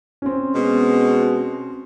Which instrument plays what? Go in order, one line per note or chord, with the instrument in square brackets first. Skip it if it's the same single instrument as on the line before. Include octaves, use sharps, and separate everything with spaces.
[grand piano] C4 C#4
[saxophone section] B2 G#3